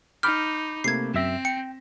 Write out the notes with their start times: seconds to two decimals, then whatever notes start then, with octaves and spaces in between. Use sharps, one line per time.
0.23 D#4 B5 D6 F6 G6
0.84 C3 A3 A#3 G#6 C7
1.14 F#2 C4 E5 A#6 B6 E7
1.45 G5 C#7